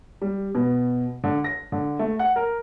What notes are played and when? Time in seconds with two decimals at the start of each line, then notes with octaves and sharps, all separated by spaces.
0.22 G3
0.55 B2
1.24 D3
1.44 A#6
1.72 D3
1.99 A3
2.19 F#5
2.36 A#4